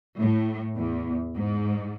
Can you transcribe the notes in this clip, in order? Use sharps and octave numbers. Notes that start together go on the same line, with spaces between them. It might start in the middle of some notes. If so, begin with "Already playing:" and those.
A2
E2
G#2